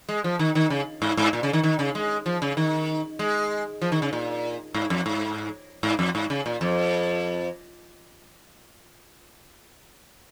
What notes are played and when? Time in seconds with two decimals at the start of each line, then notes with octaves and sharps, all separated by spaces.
0.09 G#3
0.24 F3
0.39 D#3
0.55 D#3
0.70 C#3
1.02 G#2
1.17 G#2
1.33 A#2
1.43 C#3
1.53 D#3
1.63 D#3
1.79 C#3
1.95 G#3
2.26 F3
2.42 C#3
2.57 D#3
3.19 G#3
3.81 F3
3.92 D#3
4.02 C#3
4.13 A#2
4.74 G#2
4.90 F2
5.06 G#2
5.83 G#2
5.99 F2
6.15 G#2
6.30 C#3
6.46 A#2
6.61 F2